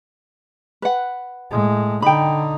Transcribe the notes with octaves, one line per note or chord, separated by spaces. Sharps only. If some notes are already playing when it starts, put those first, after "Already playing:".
B4 F#5
A2 G#3
D3 D#4 G5 B5